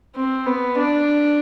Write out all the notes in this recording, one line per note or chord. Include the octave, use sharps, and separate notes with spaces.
C4
B3
D4